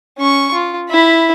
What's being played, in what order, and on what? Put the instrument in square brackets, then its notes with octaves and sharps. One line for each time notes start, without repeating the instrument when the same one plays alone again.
[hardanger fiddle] C#4 C#6
F4
E4 B5